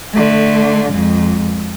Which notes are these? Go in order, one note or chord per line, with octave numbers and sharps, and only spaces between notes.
D3 A3
F2 G#3